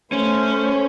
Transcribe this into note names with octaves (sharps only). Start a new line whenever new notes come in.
A3 C#4 C5